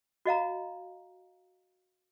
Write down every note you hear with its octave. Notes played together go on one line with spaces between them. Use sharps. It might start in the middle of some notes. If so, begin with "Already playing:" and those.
F#4 D#5 F5 A#5